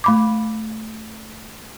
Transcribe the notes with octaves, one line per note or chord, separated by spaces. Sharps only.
A3 B5 D6